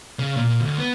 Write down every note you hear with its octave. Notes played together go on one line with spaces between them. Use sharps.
C#3
A#2
D2
B3